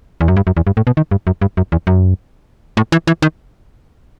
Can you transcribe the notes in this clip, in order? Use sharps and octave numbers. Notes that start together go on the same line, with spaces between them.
E2
F#2
G2
F#2
E2
G2
A2
B2
D#3
G2
F#2
G2
F#2
E2
F#2
A2
E3
E3
D#3